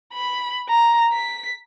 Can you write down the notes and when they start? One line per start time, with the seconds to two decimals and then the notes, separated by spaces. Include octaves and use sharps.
0.14 B5
0.69 A#5
1.13 B6